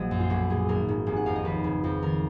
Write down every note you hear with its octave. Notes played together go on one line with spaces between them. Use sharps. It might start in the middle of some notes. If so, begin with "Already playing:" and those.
Already playing: A#1 A#2 F#3 D#5
F#2
F4
B1 F#4
A#2 G#4
G#1 A#4
G#2
F1 G#5
F#5
F2 F5
D#5
D#2 B4
C#3
F2
D#3 A#4